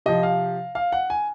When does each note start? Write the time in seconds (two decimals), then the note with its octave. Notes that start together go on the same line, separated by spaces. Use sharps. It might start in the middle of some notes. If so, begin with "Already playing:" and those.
0.06 C3 F3 D#5
0.23 F5
0.75 F5
0.92 F#5
1.10 G#5